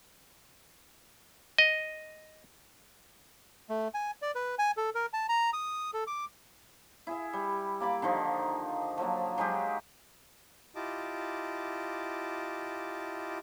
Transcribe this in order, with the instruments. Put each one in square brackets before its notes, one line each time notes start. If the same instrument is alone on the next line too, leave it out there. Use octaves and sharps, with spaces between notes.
[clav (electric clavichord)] D#5
[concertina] A3
G#5
D5
B4
G#5
A4
A#4
A5
A#5
D#6
A4
D6
[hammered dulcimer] E4 G#4 E5
G3
A#3 D5 B5 D6
D3 D#3 F3 D#4
F3 F#3 A#3
F#3 G#3 D#4 G4
[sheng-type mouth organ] E4 F4 G4 D#5 A5 D6